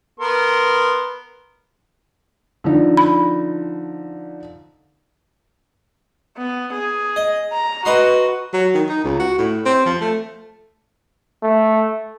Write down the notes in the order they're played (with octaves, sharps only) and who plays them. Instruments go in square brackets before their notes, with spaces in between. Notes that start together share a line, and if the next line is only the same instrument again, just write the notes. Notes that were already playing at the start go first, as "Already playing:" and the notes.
[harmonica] B3 A#4 C6
[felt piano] D3 F3 D#4
[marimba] B5
[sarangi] B3
G#4
[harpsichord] D#5
[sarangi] A#5
[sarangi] F#4 [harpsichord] B4 D#5 C6
[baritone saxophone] F#3
D#3
D#4
C#2
F#4
A2
C4
F3
A3
[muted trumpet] A3